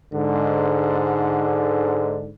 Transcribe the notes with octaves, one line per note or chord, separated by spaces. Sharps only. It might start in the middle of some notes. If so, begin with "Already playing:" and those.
G#2 D3